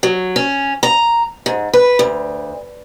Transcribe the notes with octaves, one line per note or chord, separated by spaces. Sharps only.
F#3
C#4
A#5
G#2
B4
D2